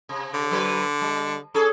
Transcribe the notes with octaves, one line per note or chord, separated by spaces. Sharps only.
C3
D3
F#3 B4
G3
C#4 G#4 A4